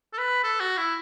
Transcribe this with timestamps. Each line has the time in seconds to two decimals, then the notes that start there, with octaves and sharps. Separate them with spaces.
0.13 A4
0.18 B4
0.43 A4
0.60 F#4
0.77 E4